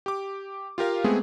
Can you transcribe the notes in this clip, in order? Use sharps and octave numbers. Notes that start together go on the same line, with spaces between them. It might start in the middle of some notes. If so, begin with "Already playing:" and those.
G4 D6
F4 G4 A#4 F5
G#3 A3 B3 C4 G#4